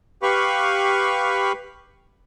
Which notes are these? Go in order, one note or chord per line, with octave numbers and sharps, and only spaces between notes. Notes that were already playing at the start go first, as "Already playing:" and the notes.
G4 B4 F5 B5 C#6